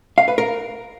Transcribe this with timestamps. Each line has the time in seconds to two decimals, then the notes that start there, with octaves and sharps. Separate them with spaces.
0.18 F5
0.28 B4
0.38 A#4